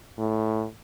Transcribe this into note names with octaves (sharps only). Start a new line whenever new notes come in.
A2